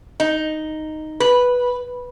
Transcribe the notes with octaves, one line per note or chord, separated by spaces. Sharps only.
D#4
B4